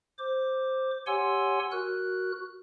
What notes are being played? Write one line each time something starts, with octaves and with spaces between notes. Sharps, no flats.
C5 D6
G4 C#5 F#5 G#5 C6 E6
F#4 A#4 F#6